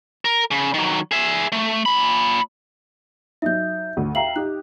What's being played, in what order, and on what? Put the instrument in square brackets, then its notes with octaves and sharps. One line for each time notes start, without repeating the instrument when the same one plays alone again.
[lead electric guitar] A#4
C#3
D#3 F#3
G#4 E5
A3
A#2 B5
[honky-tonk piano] F#3 D#4 [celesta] E5 G6
[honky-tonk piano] D2
[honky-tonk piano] E5 F5 A#5 [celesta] G5 C7 F#7
[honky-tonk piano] D#4 G4 [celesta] F#6